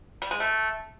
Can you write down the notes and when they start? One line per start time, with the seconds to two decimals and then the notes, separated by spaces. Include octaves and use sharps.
0.22 G3
0.31 G#3
0.40 A3